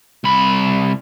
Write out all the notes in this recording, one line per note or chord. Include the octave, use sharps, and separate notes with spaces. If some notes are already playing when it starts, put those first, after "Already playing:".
C2 B5